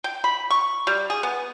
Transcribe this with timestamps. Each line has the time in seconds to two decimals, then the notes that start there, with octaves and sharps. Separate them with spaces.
0.04 G5
0.24 B5
0.50 C#6
0.87 G3
1.10 G#4
1.23 B3